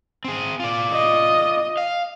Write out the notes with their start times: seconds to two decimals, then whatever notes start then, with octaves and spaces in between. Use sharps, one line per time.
0.24 C4 G#4
0.60 F4 D5
0.92 D#5
1.77 F5